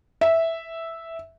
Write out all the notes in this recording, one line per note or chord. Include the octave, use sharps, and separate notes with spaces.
E5